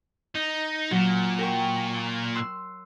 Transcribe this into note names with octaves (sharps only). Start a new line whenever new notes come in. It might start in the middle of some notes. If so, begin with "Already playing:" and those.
D#4
A#2 F#3
A#4 G5 C#6
C6 E6 F#6